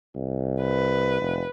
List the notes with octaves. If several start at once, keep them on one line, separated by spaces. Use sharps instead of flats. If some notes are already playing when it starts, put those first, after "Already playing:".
C2
B4
F1